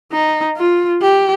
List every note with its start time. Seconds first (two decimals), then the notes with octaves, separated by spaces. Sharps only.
0.12 D#4
0.57 F4
1.02 G4